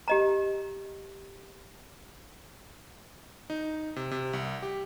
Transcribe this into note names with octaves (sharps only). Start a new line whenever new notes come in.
G4 D#5 A#5
D#4
C3
C3
C2
G4